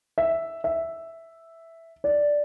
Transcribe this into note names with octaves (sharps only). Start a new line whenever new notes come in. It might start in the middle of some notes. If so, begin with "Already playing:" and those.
E5
E5
D5